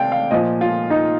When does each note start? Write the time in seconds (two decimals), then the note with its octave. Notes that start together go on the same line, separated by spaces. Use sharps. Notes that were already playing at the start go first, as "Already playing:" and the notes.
Already playing: C3 D5 F5 G5
0.12 F5
0.31 A#2 F3 D#5
0.61 F4
0.90 D#4